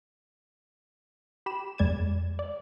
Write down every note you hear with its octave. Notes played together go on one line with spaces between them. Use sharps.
G4 B5 E7
F2 G#3 D5 G#6 A6 E7
D5